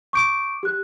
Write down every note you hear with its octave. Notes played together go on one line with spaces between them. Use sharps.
C#6 D6 G6 D7
G4 F#6